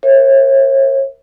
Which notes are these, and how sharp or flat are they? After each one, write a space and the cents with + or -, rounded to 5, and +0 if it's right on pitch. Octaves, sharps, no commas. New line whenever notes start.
A#4 +5 C#5 -40 E5 +0